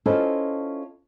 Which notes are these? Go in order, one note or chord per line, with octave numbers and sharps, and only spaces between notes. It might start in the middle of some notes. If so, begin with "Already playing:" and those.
C#4 E4 F4 A4 C5 D#5